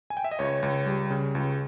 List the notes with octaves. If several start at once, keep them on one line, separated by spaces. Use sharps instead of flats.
G#5
G5
E5
D#5
C#2 C#5
C#2
G3
C#3
C#2